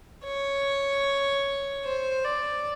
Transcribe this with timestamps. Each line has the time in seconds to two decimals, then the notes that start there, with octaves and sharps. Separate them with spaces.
0.25 C#5
1.85 C5
2.25 D5